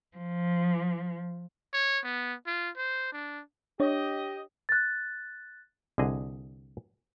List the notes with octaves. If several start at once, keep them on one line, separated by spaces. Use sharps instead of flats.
F3
C#5
B3
F4
C5
D4
D4 G4 C#5 D#5
F#6 A6
C2 D3 G#4 D#5